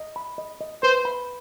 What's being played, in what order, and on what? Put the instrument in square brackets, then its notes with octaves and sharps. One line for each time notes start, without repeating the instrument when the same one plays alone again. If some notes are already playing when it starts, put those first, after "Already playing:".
Already playing: [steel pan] D#5
B5
D#5
D#5
[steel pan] B4 [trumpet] C5
[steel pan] B5